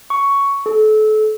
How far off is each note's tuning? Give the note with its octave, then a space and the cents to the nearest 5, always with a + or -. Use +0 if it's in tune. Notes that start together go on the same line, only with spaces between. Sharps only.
C#6 +5
A4 -35